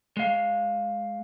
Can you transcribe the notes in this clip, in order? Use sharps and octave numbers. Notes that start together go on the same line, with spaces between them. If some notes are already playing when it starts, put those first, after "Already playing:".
G#3 F5